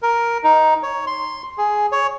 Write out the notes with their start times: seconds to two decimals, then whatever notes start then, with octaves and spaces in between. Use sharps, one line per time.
0.02 A#4
0.44 D#4
0.83 C#5
1.07 C6
1.58 G#4
1.92 C#5